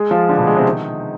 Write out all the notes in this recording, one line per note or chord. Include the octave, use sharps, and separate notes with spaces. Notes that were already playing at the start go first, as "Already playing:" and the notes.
Already playing: G#3 G#4
F3 F4
D3 D4
B2 B3
G#3
C3 C4
D#3 D#4